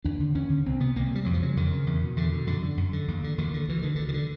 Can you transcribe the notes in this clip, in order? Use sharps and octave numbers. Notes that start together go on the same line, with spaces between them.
D#2 D4
D3
D#2 C#4
D3
C2 C4
C3 B3
C2 A#3
C3 G3
F2 F#3
F3
C#3 F#3
F2 D#3
C#3
E2
B2
E2 D3
B2
F#2 D3
D3
F#2
D3
D#2
D3
D#2 D#3
D3
D2 E3
D3 D#3
D2 D3
D#3
D3